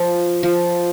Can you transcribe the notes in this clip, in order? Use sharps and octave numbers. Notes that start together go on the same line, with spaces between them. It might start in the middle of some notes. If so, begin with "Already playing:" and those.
Already playing: F3
F3